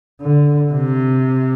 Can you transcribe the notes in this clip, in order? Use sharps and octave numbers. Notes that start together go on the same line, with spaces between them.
D3
C3